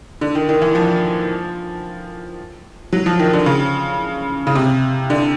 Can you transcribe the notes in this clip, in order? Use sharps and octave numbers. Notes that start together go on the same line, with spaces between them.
D3
D#3
D#3
E3
F3
F#3
F3
D#3
D3
C#3
C#3
C3
D3